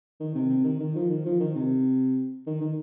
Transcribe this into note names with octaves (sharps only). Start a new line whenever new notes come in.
D#3
C3
C3
D#3
D#3
F3
D#3
F3
D#3
C3
D#3
D#3